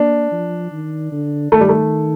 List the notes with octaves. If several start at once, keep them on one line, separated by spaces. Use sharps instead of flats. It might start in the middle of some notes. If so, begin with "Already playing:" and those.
Already playing: A#3 D4
F3
D#3
D3
D#3 A3
G3
A3